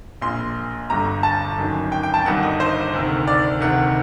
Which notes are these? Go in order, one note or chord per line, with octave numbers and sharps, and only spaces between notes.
A#1 A#2 C6
G1 G2 D3 A#5
A5
G1 F#2 D#3
G5
G5
A5
G1 G2 D#3 F#5
D#5
C5
D2 C3 D#3
D5
D2 C3 D#3 F#5